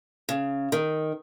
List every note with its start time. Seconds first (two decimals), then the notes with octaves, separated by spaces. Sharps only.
0.29 C#3
0.72 D#3